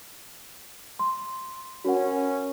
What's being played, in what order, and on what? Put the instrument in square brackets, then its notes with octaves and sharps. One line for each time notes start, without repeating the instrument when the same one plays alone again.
[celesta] C6
[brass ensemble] C#4 [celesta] F#4 A#4 F#5